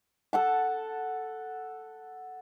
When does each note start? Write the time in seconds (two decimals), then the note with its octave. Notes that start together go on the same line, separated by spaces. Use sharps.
0.33 A4 F#5 A5